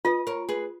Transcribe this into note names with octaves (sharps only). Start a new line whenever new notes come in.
F4 B4 D#5
A#4 C#5
G#4 B4